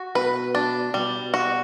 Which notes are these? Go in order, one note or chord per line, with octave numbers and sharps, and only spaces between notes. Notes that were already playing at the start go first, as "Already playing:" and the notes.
Already playing: F#4
B2 B4
D4
B2 G3
F#4